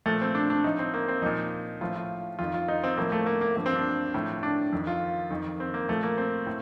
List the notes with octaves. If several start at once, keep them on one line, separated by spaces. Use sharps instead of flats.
A#2 F3 A3
C4
D4
D4
A2 F3 D#4
C4
A#3
C4
A#2 F3 D#4
A2 F3 F4
F4
F2 D#3 F4
F4
D#4
C4
A2 F3 A#3
A3
A#3
A#3
G2 F3 A#3
C4
D4
A2 F3
D4
F2 D#3
F4
F2 D#3
C4
A#3
A#2 F3 A3
A#3
C4
A2